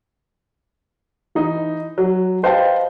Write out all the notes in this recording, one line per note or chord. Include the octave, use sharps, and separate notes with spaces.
E3 D#4
F#3
B4 C5 D#5 F5 G5 A5